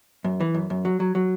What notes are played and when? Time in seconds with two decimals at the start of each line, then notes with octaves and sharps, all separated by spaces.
0.24 F#2
0.40 E3
0.54 F#2
0.70 F#2
0.85 F#3
1.00 F#3
1.15 F#3